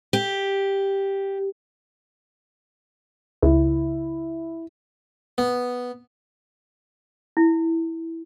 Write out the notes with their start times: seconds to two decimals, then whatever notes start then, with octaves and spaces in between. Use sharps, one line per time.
0.13 G4
3.43 C#2 E4
5.38 B3
7.37 E4